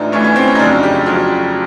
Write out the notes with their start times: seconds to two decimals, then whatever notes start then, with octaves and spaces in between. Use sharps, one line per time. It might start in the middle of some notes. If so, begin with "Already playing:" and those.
Already playing: A1 A2 E3 D4 D#4 F4
0.12 A1 A2 E3 C#4
0.24 C#4
0.36 C4
0.48 C#4
0.55 D#4
0.59 F2 C#3 F#3 D4
0.83 G4
1.06 F2 C#3 F#3